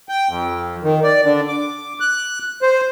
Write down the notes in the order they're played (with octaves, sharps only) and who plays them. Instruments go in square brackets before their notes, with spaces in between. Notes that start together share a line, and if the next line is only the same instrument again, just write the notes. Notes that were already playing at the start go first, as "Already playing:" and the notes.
[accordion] G5
F2
D#3
D5
D3
D6
F#6
C5